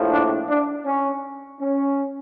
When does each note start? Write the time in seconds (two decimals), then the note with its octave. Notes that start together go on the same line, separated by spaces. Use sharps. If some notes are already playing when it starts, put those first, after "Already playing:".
Already playing: A#1 A2 F3
0.13 D4
0.49 D4
0.86 C#4
1.60 C#4